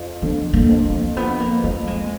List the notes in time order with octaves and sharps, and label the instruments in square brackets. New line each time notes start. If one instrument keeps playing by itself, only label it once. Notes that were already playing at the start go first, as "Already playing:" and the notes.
Already playing: [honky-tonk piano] F2 F3
[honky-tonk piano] D3 [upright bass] B3
[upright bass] A#3
[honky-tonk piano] F2
[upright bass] A#3
[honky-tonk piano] F3 [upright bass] B3
[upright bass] A#3
[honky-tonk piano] F2 [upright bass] A#3
[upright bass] G#3